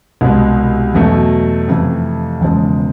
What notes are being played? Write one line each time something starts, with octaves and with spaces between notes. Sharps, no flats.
C2 B2 G#3
E2 B2 F#3 A3
F2 C3 E3 A3
E1 E2 C#3 F3 G#3